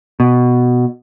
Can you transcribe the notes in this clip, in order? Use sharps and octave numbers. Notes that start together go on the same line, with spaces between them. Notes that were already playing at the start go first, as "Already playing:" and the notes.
B2